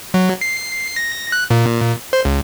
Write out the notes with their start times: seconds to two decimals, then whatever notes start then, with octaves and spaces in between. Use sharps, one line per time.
0.14 F#3
0.41 C7
0.96 A#6
1.32 F#6
1.50 A#2
2.13 C5
2.25 C#2